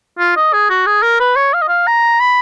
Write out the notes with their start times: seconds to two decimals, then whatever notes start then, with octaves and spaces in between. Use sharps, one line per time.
0.19 F4
0.36 D#5
0.53 G#4
0.70 F#4
0.86 G#4
1.02 A#4
1.20 B4
1.36 C#5
1.54 F5
1.61 D#5
1.68 F5
1.87 A#5
2.20 B5